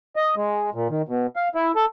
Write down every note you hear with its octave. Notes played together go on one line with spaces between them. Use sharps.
D#5
G#3
A#2
D#3
B2
F5
E4
A4